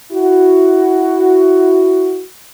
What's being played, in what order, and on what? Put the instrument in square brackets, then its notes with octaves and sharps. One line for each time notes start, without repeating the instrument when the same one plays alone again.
[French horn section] E4 F#4